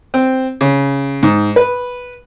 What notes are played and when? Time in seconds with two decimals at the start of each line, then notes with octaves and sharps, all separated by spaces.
0.14 C4
0.61 C#3
1.23 G#2
1.56 B4